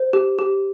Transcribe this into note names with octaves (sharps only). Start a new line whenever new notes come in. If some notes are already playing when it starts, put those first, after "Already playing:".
Already playing: C5
G4
G4